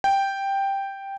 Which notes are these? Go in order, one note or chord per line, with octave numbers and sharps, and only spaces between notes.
G5